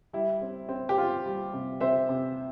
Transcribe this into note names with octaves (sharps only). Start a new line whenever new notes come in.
G3 E4
C4
C4
G4
C4 F4
G3
C3
C3 C5 E5
C3